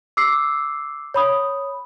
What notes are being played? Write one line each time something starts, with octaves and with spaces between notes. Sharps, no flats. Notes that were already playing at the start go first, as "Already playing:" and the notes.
D6 E6 C7
C#5 B5 D#6